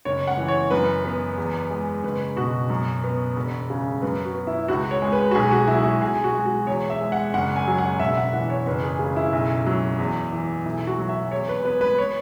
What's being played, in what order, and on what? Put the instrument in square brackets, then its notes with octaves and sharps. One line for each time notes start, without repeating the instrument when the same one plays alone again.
[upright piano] F#1 C#5
F#5
E3
C#5
F#2 B4
B3
E2
G#3
F#1 B4
B2 F#4
F#2
B3
E1
C#3
F#2 B4
F#4
B3
E4
C#2 F#4
C#5
G#3
B4
F#4
B1 G#4
F#4
F#3 E4
G#4
F#4
B1 G#4
F#4
G#3
F#4
E2 C#5
E5
G#3
F#5
F#1 F#5
G#5
F#3
F#5
E1 E5
F#5
E3 F#5
C#5
F#1 B4
G#4
C#3
E4
B1
F#3
E2
E3
B1 E4
F#4
F#3
E5
E2 C#5
B4
B3 B4
B4
C#5